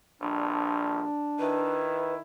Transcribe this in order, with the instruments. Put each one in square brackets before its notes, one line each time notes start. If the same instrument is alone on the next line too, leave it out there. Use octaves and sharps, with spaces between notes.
[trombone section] A#1 G2 F3 [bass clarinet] D4
[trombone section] D#3 E4 [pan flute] B4